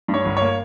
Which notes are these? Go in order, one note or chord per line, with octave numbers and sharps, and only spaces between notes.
G2
C#5
G1
C#5
A#3